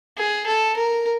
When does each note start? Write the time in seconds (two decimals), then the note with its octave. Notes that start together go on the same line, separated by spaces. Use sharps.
0.17 G#4
0.47 A4
0.77 A#4